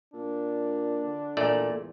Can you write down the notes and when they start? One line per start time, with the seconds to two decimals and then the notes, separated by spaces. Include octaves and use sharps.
0.14 A#2 D4
1.03 D3
1.37 E2 A#2 A3 D5